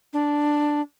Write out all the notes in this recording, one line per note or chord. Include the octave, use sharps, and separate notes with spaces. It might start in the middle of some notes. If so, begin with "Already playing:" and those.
D4